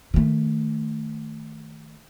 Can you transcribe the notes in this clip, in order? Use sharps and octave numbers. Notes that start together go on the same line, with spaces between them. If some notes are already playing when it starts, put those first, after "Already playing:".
D#3 A3